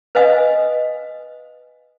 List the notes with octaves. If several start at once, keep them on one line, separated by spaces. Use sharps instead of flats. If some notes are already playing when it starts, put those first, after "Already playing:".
B4 C5 D#5 F5 G#5 D#6